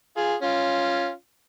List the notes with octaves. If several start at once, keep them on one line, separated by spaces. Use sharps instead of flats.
F4 G#4
C#4 F4